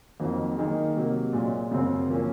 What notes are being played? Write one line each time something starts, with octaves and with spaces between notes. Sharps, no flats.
F2 D#3 F#3 A#3
D#3 A#3 D#4 G#4
C3 F#3 A#3
A#2 G#3 C#4
F#2 C#3 F#3 C4
F3 A#3 C#4